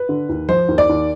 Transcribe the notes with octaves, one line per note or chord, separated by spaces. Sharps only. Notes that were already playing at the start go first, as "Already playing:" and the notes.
Already playing: B4
D3
D#2
F3 C5
D#2
D5
D#2